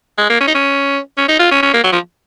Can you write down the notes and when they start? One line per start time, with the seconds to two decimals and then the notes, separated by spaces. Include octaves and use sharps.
0.18 G#3
0.30 A#3
0.41 C#4
0.48 D#4
0.55 C#4
1.18 C#4
1.29 D#4
1.39 F4
1.51 C#4
1.63 C#4
1.74 A#3
1.84 F#3
1.92 F3